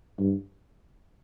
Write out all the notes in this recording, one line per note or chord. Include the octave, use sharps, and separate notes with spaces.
G2